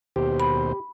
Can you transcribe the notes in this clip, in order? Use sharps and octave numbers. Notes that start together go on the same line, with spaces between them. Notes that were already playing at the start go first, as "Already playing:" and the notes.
D#2 B2 G4 C5
B5